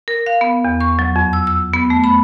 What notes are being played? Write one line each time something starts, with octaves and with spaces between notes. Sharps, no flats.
A#4
F5
B3
E2
C#6
F#3
F2
E6
E6
B3
A3
B5